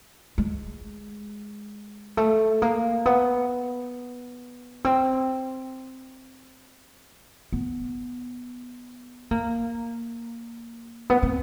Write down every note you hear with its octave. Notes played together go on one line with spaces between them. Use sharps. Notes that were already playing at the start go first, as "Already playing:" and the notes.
G#3
A3
A#3
B3
C4
B3
A#3
B3
C4